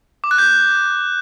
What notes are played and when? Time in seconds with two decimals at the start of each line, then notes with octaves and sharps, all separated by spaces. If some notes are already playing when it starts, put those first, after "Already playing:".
0.24 D6
0.31 F#6
0.38 G6